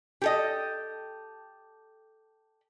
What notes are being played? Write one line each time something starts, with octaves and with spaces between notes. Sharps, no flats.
G4 A4 D#5